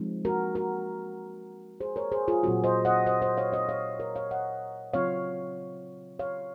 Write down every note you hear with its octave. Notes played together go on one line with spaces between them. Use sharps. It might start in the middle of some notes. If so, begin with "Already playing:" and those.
Already playing: F3 G#3 C4 D#4
F#4 A#4
F#4 A#4
G#4 C5
A#4 C#5
G#4 C5
F4 G#4
A#2 F#3 C4 F4 F#4
C5 D#5
D#5 F#5
C5 D#5
C5 D#5
C#5 F5
C5 D#5
C#5 F5
A#4 C#5
C#5 F5
D#5 F#5
C#3 F#3 C4 F4 C#5 F5
C#5 F5